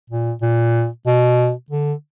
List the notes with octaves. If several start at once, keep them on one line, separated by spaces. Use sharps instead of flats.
A#2
A#2
B2
D3